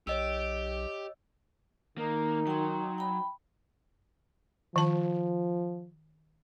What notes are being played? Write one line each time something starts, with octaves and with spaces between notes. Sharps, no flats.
B1 G4 C#5 D#5 E6
D#3 A#3 D#4
F#3 G5 C6
G5 B5
D#3 F3 A5